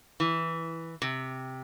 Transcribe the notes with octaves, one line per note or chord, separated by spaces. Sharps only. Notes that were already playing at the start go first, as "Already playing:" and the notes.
E3
C3